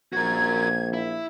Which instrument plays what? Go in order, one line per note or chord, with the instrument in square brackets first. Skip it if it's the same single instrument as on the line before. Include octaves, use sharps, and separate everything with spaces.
[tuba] A#1 [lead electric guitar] F#4 A#4 [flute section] G#6
[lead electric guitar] E4